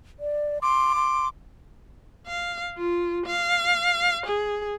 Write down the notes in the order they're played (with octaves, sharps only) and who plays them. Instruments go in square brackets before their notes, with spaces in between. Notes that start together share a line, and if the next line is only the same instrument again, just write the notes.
[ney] D5
[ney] C6 [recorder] D6
[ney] C6
[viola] F5
F4
F5
G#4